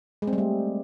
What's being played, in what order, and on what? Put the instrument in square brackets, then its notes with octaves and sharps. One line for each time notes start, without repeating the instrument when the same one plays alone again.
[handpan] G#3
C4
G3
A3